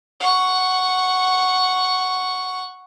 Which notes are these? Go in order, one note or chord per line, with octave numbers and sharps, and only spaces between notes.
F#5 C#6